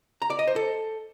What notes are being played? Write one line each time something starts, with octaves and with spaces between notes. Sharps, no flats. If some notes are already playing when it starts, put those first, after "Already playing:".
A#5
D5
D#5
C5
A4